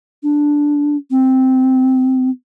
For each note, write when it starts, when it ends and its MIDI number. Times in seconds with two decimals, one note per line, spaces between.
0.23 0.96 62
1.11 2.30 60